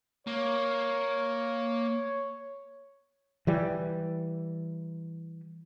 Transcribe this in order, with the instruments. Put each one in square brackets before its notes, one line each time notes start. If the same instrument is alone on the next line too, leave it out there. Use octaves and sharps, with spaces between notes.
[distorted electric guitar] A#3 [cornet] C#5
[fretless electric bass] E3 G3